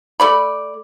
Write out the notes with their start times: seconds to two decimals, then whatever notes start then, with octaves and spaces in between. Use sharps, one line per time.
0.20 A3 D5 B5